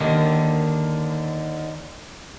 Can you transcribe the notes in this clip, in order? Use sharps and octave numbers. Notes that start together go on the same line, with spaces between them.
D#2 D3 D#3